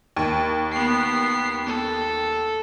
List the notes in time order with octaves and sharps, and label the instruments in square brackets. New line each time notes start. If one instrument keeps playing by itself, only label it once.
[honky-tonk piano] D#2
[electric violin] B3 C7
A4